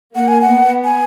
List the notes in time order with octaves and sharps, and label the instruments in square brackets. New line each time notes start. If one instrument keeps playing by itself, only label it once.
[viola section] A#3 [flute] F#5
[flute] G#5
F#5
[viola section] B3
[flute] G#5